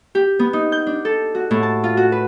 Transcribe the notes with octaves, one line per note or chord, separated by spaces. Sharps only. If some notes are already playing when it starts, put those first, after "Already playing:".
G4
B3
D#4
G6
D4
A4
F#4
A2
A5
F4
F#4
B4